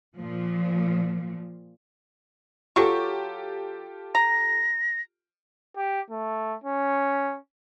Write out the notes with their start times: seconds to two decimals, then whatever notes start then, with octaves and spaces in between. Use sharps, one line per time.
0.17 A#2 F3
2.76 F#3 F4 G4 A4 C#6
4.15 A#5 A#6
5.77 G4
6.10 A3
6.64 C#4